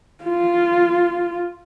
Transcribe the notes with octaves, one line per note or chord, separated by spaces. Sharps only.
F4